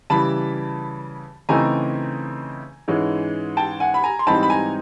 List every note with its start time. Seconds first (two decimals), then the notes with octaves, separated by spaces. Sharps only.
0.10 C#3 E3 G3 A5 B5
1.49 C#3 E3 A3 C4 D#4 G#5 A#5
2.88 G#2 E3 G#3 C#4
3.57 G5 A5
3.80 F#5 G#5
3.94 B5
4.04 G#5 A#5
4.19 C6
4.27 G#2 E3 G3 C4 D#4 A5 B5
4.43 B5
4.50 G#5 A#5